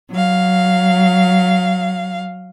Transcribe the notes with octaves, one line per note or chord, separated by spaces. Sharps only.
F#3 F5